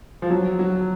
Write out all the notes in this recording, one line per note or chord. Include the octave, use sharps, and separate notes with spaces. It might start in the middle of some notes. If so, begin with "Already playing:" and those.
F3
F#3
F#3